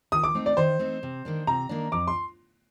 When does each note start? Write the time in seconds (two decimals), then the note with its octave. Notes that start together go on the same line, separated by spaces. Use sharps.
0.12 D#3 D#6
0.24 D6
0.35 A3 C4 D#4
0.46 D5
0.57 D#3 C5
0.79 A3 C4 D#4
1.03 C3
1.25 D#3 A#3 D4
1.47 C3 A#5
1.69 D#3 A#3 D4
1.92 F2 D6
2.08 C6